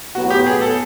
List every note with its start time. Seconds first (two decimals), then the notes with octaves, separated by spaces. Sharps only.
0.15 A2 F#3 B3 F#4
0.30 G4
0.47 G#4
0.61 A4